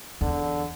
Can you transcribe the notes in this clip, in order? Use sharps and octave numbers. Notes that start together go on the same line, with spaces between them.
E2 D3